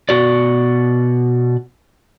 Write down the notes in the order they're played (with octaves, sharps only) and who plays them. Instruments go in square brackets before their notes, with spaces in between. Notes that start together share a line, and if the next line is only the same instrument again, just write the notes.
[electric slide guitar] B2 F#4 D5